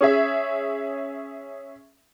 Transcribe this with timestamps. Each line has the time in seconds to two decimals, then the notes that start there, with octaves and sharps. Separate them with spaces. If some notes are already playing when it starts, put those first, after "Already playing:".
0.01 C#4 G#4 E5